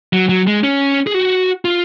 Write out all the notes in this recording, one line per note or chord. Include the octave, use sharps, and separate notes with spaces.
F#3
F#3
G#3
C#4
G#4
F#4
F4